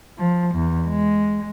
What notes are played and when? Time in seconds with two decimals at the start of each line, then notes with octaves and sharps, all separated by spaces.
0.18 F3
0.55 E2
0.87 G#3